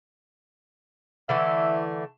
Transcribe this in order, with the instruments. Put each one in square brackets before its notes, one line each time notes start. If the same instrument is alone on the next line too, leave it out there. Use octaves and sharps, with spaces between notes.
[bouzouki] D3 E3 A3 [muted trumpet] E5